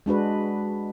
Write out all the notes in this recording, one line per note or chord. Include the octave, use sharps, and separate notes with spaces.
G#3 D4 F#4 B4